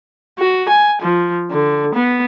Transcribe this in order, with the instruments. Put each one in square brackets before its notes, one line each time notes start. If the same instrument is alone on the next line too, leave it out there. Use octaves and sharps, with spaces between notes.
[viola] F#4
G#5
F3
D3
B3